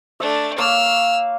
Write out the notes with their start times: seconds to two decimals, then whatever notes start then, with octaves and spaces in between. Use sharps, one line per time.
0.20 A3 D4 E5
0.58 A#3 C#5 F5 E6 F6